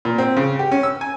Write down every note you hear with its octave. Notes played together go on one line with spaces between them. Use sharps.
A#2
C4
C#3
G4
C#4
E6
G#5